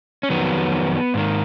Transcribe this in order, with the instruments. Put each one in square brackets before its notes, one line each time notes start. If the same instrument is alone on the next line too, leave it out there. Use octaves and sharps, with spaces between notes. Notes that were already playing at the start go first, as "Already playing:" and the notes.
[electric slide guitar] C#4
F2 D#3 F#3 B3
G#2 D#3 A#3